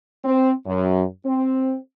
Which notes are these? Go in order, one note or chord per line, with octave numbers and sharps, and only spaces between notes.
C4
F#2
C4